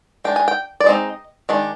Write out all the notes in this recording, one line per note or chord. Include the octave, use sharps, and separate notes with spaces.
G#3 D4 G5
G#5
G5
D5
G#3 C4 D#4 D#5
D#3 G#3 D4